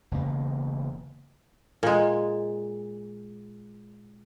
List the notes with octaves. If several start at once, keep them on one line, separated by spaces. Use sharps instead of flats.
E1 C#3 A#3
A#2 G#3